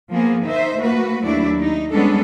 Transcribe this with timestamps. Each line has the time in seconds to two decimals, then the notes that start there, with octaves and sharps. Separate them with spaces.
0.11 F3 A#3 B3 G#4
0.46 D#3 D#4 C5 E5
0.78 A3 A#3 F#4 B4
1.23 D#2 F#3 A3 D4 E4 D5
1.59 D#4
1.91 G3 G#3 B3 C#4 D4 A4